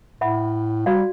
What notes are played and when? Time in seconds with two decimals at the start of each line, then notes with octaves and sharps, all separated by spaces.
0.21 A2 E5 F#5 B5
0.86 G3 F#4 D5 F5